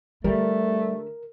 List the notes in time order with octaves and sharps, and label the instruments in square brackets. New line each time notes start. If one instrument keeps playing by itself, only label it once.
[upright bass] D3 [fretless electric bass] G3 [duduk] A3 [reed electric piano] A#4